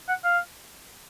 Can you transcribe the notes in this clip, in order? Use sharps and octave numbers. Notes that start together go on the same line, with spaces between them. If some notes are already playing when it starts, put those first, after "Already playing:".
F#5
F5